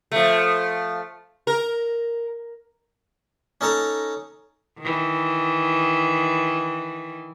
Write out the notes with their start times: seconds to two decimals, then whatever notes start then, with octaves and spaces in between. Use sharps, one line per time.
0.12 F3 A3
1.47 A#4
3.61 C#4 D#4 A4 A5 A#5
4.79 D#3 E3